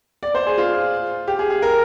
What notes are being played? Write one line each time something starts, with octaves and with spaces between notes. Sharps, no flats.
D5
C5
G#4
F4
G4
G#4
G#4
A#4